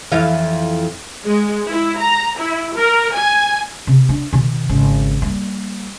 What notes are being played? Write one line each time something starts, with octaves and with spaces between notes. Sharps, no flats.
F2 E3 F5
G#3
E4
A#5
E4
A#4
G#5
C3
D4
B2 D#3
G#1 C#3
G3 A#3